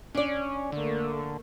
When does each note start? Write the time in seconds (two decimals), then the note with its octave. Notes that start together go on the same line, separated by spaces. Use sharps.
0.15 C#4 D4 D5
0.72 D3 A3 A#3